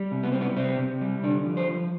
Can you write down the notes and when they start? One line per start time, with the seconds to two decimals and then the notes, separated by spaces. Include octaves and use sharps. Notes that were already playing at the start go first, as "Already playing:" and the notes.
Already playing: G3
0.12 C3
0.23 B3
0.32 G3 C4
0.41 B3
0.57 C3 C4
0.79 C3
1.01 G3
1.23 D3 D4
1.46 F3
1.57 C5
1.68 F3